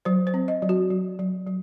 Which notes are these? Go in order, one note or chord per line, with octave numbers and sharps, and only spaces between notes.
F#3 C5
C5
C4
D#5
F#3
F#4
F#3
F#3
F#3